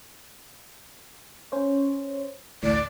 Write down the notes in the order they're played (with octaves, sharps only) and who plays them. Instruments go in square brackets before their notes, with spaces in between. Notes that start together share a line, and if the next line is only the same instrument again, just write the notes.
[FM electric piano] C#4 C5 C#5
[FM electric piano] A1 D2 A2 [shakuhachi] D5